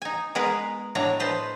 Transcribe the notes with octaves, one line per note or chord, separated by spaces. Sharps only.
D#4 G#5
G#3 B3 G#4 A#4 B4
A2 F#3 D4 C#5 D#5 A#5
B4 C5 D#5 A5